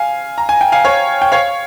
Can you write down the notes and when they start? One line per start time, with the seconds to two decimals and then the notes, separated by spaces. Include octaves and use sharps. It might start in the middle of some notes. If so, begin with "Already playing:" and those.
Already playing: F5 G#5
0.38 A#5
0.49 G#5
0.61 G5
0.72 F5 G#5
0.84 C#5 F5
1.22 G5
1.32 C#5 F5